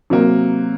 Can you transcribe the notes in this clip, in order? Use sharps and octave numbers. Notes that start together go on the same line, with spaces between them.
C3 F#3 A#3